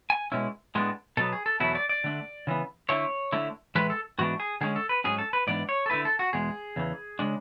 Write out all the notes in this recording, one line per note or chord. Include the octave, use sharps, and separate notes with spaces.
G#5
B2 G#3 C#4 E4
A2 G#3 B3 D4
B2 F#3 B3 A4
G#4
A4
E2 B2 F#3 A3 E4
D5
D5
D3 A3 D4
C#3 E3 B3
D3 A3 E4 C#5
D3 A3 E4
A2 E3 G#3 B4
A4
G#2 E3 B3 D4 F#4
G#4
D3 G#3 C#4 G#4
A4
B4
G#2 F#3 C#4 G#4
A4
B4
G#2 E3 B3 D4 D5
C#5
A4
D3 A3 E4 B4
A4
F#4
E2 B2 G#3 G#4
E2 C#3 E3
C#3 G#3 D4